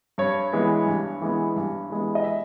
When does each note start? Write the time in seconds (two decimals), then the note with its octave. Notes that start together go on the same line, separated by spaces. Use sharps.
0.18 G2 C#5
0.53 E3 G#3 B3
0.86 G2
1.22 E3 G#3 B3
1.56 G2
1.90 E3 G#3 B3
2.15 D#5
2.24 E5